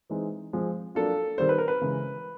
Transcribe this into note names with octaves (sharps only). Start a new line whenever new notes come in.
E3 G#3 C4 D#4
F3 G#3 C4
F#3 A#3 D4 F4 A4
D#3 G3 C4 C5
B4
A#4
B4
C#3 E3 G#3